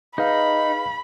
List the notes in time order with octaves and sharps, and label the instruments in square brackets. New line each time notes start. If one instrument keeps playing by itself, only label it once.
[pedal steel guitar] D#4 [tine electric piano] G#4 B4 F5 [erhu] B5